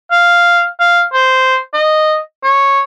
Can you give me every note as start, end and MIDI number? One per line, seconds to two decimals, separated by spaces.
0.11 0.66 77
0.79 1.03 77
1.13 1.58 72
1.74 2.18 75
2.43 2.81 73